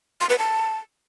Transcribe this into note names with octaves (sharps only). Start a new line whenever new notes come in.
C6
B4
A5